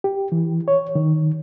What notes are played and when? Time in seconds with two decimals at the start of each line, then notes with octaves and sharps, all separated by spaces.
0.04 G4
0.32 E3
0.68 C#5
0.95 D#3